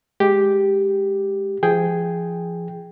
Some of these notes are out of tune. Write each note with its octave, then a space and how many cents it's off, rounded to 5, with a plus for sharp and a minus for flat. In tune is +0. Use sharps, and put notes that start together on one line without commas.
G#3 +0 G4 +0
F3 -30 G#4 +0 G5 +0